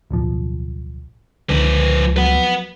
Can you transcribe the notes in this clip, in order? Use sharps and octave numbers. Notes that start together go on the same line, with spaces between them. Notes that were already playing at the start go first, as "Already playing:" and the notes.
D1 B1 F3
C#2 D3 D#3 F3 B4
F3 F#3 B4 F#5